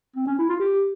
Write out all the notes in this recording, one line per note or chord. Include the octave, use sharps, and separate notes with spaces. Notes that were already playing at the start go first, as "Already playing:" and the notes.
C4
C#4
E4
F4
G4